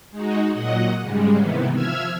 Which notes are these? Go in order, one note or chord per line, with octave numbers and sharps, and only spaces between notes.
G#3 D#4 F#4
A#2 F#3 D#5 F#5
G#2 C#3 G3 G#3
C3 D#3 E3 B3
F3 E5 E6 F6 G#6